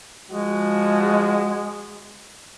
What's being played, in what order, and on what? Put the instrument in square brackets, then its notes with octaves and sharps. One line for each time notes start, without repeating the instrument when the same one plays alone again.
[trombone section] F3 F#4 [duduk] G#3